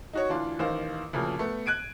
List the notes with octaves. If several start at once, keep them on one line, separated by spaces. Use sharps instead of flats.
D#4 F#4 C#5
D2 E3 D4 F4 C6
A1 D#3 C5 F5
D2 A#2 C#3 F3
A3 B3
F#6 G#6 D7 D#7